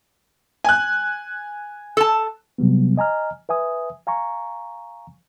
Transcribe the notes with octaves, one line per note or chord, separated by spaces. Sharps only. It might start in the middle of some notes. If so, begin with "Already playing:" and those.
G#5 F#6
A4 A5
C3 F#3 G3 B3
D#5 G#5 A#5 F6
B4 E5 G#5 D#6
F5 G#5 A#5 C#6